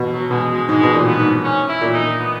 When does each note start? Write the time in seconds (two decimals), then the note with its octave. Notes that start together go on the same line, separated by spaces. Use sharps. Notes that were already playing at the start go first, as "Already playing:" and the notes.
Already playing: B2
0.13 F#3
0.31 B2 G#3
0.50 G#3
0.68 G#2 G#3
0.83 B2
0.94 A#2
1.06 B3
1.19 G#2
1.44 C#4
1.68 E4
1.81 A#2
1.94 D#4
2.20 B3